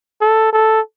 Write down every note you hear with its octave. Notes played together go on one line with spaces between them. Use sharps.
A4
A4